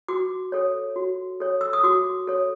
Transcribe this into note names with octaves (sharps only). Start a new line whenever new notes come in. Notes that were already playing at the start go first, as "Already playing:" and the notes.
F#4 D6
A4 C#5
F#4
A4 C#5
E6
D#6
F#4 D6
A4 C#5